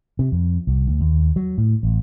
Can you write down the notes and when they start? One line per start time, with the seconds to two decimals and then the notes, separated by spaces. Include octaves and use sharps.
0.19 C3
0.32 F2
0.67 C2
0.87 D2
1.01 D#2
1.36 F#3
1.58 A2
1.83 A1